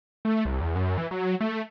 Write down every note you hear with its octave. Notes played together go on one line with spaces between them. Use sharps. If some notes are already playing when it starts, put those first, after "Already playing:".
A3
C2
E2
F#2
E3
F#3
A3